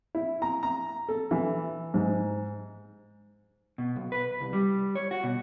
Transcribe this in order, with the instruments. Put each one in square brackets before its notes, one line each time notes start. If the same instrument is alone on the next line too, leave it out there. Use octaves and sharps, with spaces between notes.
[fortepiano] E4
A#5
A#5
A4
E3
G#2
[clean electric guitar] B2
B1
B4
C2
G3
C#5
F#4
B2